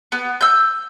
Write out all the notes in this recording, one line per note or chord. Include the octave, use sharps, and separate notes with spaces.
B3
E6 G6